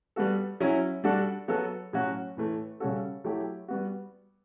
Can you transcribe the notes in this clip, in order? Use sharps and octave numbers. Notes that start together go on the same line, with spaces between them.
G3 B3 F#4 A4
F#3 C#4 E4
G3 D4 F#4 A4
F#3 B3 F#4 A4
A2 F#3 C#4 F#4
A2 E3 A3
C#3 G3 C#4 F#4 A4
F#3 A3 E4 G4
G3 B3 F#4